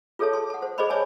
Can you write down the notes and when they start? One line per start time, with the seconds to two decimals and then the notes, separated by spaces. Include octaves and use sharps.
0.19 F4 G#4 A4 C#5 E5 A5
0.33 A5 C6
0.50 F#5 A5
0.62 C5
0.78 G#4 C5 D5 D#5 B5 C#6
0.90 C#5 D5 E5 G#5 A5